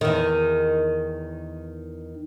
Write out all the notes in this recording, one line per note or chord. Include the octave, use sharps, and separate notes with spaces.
E2 D#3